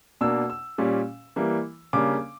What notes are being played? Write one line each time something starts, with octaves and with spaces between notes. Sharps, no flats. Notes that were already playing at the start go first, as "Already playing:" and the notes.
B2 A#3 D4 E6
E6
A#2 G3 C#4
E3 G3 A#3
C#3 G3 A#3 D4 D6